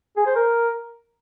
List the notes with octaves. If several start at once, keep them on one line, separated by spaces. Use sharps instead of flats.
G#4
C5
A#4